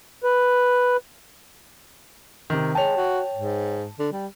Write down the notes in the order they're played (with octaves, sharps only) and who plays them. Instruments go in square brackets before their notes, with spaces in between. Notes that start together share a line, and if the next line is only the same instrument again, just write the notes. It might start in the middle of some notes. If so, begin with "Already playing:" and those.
[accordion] B4
[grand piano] C3 D#3
[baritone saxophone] G#3 [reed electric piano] C#5 G5 [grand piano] A5 F7
[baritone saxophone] F#4
G#2
D3
G3